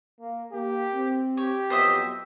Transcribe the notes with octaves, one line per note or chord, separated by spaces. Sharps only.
A#3
A#3 G4
C4
G4 C#5
F2 F#3 B3 C5 D#5 E5